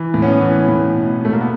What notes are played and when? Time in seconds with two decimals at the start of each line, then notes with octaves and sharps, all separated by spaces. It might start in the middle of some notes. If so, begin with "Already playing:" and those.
Already playing: E3
0.14 A2
0.22 B3 C#4
0.41 E3
0.68 A2
0.95 B2
1.21 B2 A3
1.33 A#3
1.40 B3